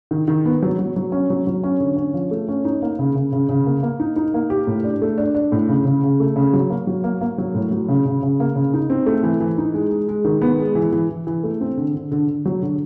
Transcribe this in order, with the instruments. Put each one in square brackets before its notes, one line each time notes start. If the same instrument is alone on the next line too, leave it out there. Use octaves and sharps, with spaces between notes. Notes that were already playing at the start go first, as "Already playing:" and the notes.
[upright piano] D#3
D#3
B3
F#3
F#3
F#3
C#4
F#3
F#3
C#4
D3
C#4
F3
A3
C#4
D#4
A#3
C#3
C#3
C#3
C#3
A#3
A#3
D#4
D#4
A#3
G4
A2
D4
A3
D4
D4
A2
C#3
C#3
C#3
A3
C#3
F#3
A#3
F#3
A#3
A#3
F#3
A2
F#3
C#3
C#3
C#3
A#3
C#3
D#4
C4
A3
E3
E3
D#4
G#3
G#3
G#3
D#3
B3
G#3
E3
E3
E3
E3
A3
C4
D3
D3
D3
D3
F#3
D3